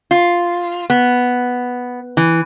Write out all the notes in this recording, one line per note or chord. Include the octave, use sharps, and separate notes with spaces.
F4
B3
E3